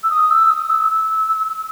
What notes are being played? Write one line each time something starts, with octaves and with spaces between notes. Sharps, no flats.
E6
D#6
E6
D#6
E6